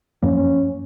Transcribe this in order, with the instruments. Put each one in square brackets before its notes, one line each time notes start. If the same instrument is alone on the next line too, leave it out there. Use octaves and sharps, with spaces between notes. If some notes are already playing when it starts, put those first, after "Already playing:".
[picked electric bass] F#2 F3 A#3 [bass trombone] C#4